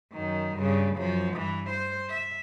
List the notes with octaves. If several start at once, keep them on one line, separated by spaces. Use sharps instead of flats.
F#2 D#3
G2 C#3
F#2 F3
G2 E3
C5
E5